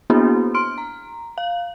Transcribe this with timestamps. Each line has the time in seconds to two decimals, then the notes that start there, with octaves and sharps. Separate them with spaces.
0.10 A#3 B3 D4 E4 F#4 G#4
0.54 C6 F6 D7
0.78 A#5
1.38 F5